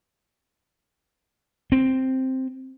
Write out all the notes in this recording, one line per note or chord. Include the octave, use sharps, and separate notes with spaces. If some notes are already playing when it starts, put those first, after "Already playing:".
C4